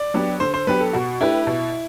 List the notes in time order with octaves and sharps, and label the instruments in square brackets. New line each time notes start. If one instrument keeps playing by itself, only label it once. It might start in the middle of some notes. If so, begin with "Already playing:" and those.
Already playing: [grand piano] D5
[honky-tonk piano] F#3 B3 D4 G4
[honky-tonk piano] D3 [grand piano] C5
[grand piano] C5
[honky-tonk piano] F#3 B3 D4 G4 [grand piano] B4
[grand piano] A4
[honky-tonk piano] B2 [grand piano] F#4
[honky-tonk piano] A3 D4 G4 B4 [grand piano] E4
[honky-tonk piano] B2